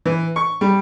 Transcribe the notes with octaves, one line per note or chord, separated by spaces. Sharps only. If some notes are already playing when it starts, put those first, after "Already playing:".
E3
C#6
G3